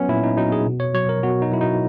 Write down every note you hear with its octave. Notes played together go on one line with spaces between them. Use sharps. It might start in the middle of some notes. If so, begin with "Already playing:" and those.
Already playing: F#3 B3 C#4
A#2 E4
D#4
F#3 D#4
G#4
B2
C#5
F#3 C#5
A#4
B2 F#4
D#4
F#3 E4
D#4